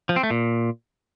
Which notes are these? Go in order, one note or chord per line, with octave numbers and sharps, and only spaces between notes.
F3
C4
A3
A#2